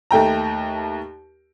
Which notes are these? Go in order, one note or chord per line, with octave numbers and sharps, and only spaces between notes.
D#2 A3 G5 A#5